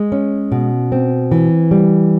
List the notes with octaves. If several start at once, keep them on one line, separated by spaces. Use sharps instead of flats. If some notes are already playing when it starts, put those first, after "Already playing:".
Already playing: G#3
C#4
B2
C4
E3
G3